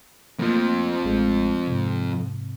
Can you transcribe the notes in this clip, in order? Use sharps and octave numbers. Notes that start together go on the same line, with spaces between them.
F2 F3 A3 A#3
A1 G#3 A3
G#2 C3